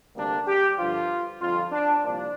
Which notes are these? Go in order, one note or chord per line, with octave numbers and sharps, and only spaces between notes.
D2 C3 G3 A#3 D4
G4
G2 D3 F3 F4
F2 D3 G3 F4
D4
C2 A#2 F3 A#3 D4